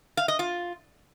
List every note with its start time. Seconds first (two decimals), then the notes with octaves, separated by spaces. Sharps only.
0.17 F5
0.28 D#5
0.39 F4